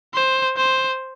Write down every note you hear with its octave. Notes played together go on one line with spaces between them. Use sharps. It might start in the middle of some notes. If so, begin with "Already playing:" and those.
C5
C5